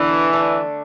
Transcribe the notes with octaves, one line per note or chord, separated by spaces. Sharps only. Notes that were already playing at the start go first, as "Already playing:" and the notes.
Already playing: D3 E3 B3 D4
D3 A3 D4